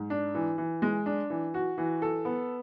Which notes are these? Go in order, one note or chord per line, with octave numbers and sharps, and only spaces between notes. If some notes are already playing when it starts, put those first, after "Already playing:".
Already playing: G#2
D4
E3
E3
G#3
D4
E3
F#4
E3
A4
B3